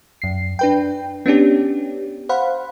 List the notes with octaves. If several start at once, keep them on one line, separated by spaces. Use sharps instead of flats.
F#2 C7
D4 B4 G5
B3 C#4 D4 G4
C5 F5 F#5 B5